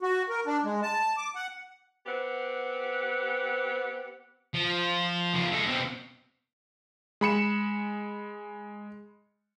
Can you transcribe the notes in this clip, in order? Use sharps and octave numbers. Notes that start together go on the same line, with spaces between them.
F#4
A#4
D4
G#3
A5
D6
F#5
B3 C4 G4 F#5
F3
C#3 F3
G#3 A4
B2 C4
G#3 B5 C#7 E7